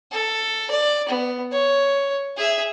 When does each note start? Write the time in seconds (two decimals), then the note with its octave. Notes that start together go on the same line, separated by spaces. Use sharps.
0.11 A4
0.70 D5
1.08 B3
1.52 C#5
2.37 G#4 E5